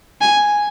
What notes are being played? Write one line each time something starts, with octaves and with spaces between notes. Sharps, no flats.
G#5